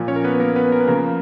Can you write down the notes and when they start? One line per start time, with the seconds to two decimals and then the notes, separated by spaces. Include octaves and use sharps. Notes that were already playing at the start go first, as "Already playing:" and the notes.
Already playing: A#2 F3
0.08 C#4 C#5
0.16 A#4
0.24 B3 B4
0.40 A#3 A#4
0.56 B3 B4
0.72 A#4
0.80 B4
0.87 C#3 F3 A#3 A#4